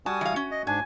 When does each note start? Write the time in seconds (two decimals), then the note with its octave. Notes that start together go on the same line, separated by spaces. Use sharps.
0.06 G3 F#4 G#5 A5 D#6
0.21 E3 F5
0.36 C#4
0.51 D#5
0.67 G#2 D4 G#5